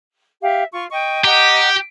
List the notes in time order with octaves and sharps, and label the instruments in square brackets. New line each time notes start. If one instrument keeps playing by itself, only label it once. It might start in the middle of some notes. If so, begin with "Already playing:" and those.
[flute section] G4 E5 F5
F4 C#6
D#5 G5 C#6
[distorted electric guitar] G4 [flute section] D#5 F#5 A#5